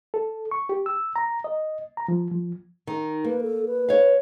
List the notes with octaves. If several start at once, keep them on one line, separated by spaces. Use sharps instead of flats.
A4
C#6
G4
E6
A#5
D#5
A#5
F3
F3
D#3
A#3 B4
A4
B4
C#5 F5